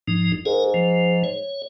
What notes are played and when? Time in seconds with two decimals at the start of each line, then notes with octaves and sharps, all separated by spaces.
0.08 G#2 F3 D#4
0.46 G#2 G#4 A#4
0.74 F3
1.24 C#5